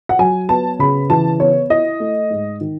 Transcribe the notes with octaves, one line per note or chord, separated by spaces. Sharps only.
F#5
F#3 G#5
B3 A5
C#3 B5
E3 A5
B3 C#5
E4 D#5
A3
G#2
D#3